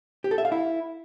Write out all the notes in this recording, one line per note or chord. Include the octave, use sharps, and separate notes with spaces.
G4
A4
E5
F5
E4